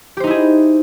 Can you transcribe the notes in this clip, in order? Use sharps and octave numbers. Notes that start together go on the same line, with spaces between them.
D#4 E4 G4 G#4 C5